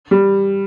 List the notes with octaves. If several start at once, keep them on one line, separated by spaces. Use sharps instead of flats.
G3